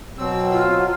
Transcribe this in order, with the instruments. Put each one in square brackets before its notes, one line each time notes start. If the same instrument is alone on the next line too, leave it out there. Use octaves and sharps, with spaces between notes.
[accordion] B2 C4 E6 [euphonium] F#3
[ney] F4